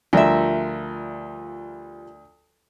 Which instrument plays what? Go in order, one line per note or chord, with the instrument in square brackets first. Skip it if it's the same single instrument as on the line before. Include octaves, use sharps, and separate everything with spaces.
[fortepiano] D2 [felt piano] F3 G3 F4 [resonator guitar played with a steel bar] A#4 E5